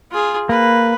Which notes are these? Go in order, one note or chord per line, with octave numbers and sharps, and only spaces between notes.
F4 G#4
A#3 B4